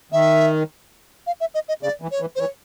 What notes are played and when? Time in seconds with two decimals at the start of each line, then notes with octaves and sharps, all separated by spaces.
0.12 D#3 E5
1.26 F5
1.40 E5
1.54 D#5
1.68 D#5
1.82 C#3 D5
2.02 E3
2.11 C#5
2.20 E3
2.35 C5
2.39 E3 C#5